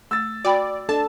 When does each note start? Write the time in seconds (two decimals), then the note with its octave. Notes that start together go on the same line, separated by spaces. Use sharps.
0.11 A3 E6 A6
0.45 F#4 D5 G5 B5
0.89 D4 A4 A5